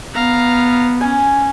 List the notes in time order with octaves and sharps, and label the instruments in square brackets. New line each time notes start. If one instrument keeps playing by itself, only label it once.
[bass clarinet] B3 [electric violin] F5 A#5
[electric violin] C#4 [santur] G#5